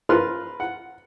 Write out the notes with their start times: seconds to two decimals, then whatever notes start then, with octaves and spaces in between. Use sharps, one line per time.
0.09 F4 A#4 B4 C6 F6
0.60 F#5